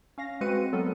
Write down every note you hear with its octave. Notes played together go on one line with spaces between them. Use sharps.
C#4 F5 A#6
G#3 C4 F#4 B4 C#7 D#7
F#3 B3 A4 A#4